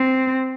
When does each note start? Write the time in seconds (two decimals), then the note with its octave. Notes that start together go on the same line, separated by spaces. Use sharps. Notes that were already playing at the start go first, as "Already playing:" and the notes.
Already playing: C4